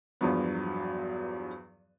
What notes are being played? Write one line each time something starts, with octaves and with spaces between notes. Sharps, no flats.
E2 G2 F3 F#3 B3